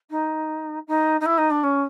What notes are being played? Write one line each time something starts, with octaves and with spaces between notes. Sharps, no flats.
D#4
D#4
D#4
E4
D#4
D4
C#4